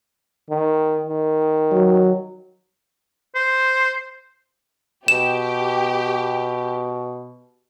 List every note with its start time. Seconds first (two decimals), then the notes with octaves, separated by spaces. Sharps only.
0.50 D#3
1.07 D#3
1.71 F#3
3.35 C5
5.08 B2 G4 E7